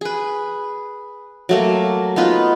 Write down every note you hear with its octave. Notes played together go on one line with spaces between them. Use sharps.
G#4 B4
F#3 A3 A#3
B3 D#4 F4 B4